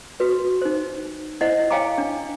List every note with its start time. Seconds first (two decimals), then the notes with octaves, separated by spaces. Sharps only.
0.20 F#4 B4
0.62 D#4 C5
1.41 E4 C5 D#5 F#5
1.70 C#5 F5 G5 G#5 A#5 D6
1.98 D4